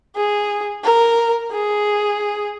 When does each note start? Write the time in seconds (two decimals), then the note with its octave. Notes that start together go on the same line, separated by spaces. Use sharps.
0.16 G#4
0.84 A#4
1.51 G#4